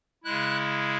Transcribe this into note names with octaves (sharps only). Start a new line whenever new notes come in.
C#3 G#3 E4 F#6